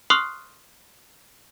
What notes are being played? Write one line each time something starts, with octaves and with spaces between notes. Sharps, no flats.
C6 C#6 D#6 F6 F#6 C7